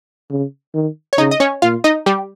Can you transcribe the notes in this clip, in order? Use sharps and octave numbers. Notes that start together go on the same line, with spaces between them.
C#3
D#3
C#5
C#3 D#4 D#5
D#5
C#4 C#5
A#2 F4 F5
D#4 D#5
G3 G4